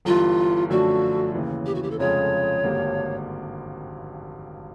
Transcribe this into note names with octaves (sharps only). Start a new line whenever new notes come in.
G1 G2 E3 F4
F#2 D3 F3 A3 D4 F#4
D#2 C#3 E3
G4
F#4
G4
A4
F1 F2 C#3 F3 G#3 C#5
G#1 G2 D3 G3 A#3